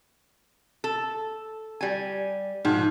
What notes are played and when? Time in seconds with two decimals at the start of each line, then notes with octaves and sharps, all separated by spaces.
0.84 A4
1.81 G3 G#5
2.65 G#2 F3